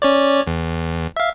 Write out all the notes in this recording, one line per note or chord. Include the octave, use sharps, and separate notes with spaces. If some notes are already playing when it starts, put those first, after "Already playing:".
C#4 C#5 D5
E2
E5 F5